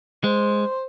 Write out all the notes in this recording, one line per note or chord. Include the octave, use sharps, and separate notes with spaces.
G#3 C5